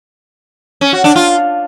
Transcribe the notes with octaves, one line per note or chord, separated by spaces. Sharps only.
C#4
F#4
D4
F4